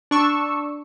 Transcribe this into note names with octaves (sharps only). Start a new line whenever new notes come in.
D4 C#6 E6